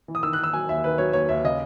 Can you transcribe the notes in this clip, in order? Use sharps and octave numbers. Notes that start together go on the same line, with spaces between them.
E3
D#6
D#3 E6
F#6
D#3
E6
F#3 G#5
D#2 E5
D#3 B4
F#3 C#5
D#2 C#5
D#2 E5
C#3 D#5